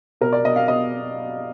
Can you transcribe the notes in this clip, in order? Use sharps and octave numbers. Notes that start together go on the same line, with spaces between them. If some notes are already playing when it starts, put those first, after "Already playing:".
B2 A#4
D5
B2 D#5
F5
B2 D#5